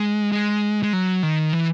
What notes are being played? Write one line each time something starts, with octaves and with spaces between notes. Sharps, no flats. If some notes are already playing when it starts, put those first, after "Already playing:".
Already playing: G#3
G#3
G#3
F#3
D#3
E3